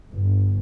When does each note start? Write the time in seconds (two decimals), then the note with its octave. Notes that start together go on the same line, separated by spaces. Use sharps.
0.11 G1